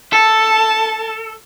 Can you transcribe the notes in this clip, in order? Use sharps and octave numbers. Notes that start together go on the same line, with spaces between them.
A4 A5